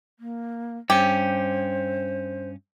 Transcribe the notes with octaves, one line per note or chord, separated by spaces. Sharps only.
A#3
G2 C#4 G4 C5